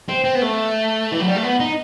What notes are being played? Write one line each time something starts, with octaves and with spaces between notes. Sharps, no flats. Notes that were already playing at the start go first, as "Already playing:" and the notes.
C4
C4
B3
A3
E3
F#3
G3
A3
B3
D#4